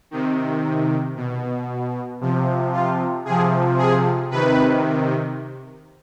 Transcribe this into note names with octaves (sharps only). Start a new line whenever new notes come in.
C3 D#3
B2
C3 F3
F4
C3 F3 G#4
G#4
C3 D#3 B4